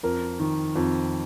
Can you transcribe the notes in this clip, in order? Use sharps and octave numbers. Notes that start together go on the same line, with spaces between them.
F2 A#4
D#3
F2